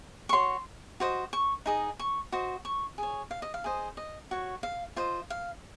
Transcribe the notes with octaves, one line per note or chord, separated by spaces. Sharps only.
C#6
F#4 C#5 C6
F#4 C5 D#5
C#6
D#4 G#4 D#5
C#6
F#4 C5 D#5
C#6
G#4 C#5
F5
D#5
F5
G#4 C5 D#5
D#5
F#4 C#5
F5
F4 C5 D#5
F5